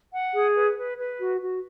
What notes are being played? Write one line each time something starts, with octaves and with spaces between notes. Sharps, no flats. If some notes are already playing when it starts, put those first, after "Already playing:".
F#5
G#4
B4
B4
B4
F#4
F#4